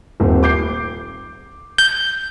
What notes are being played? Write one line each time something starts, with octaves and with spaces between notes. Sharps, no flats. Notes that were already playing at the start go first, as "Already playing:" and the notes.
D#1 C4
D6 G6 C7
G6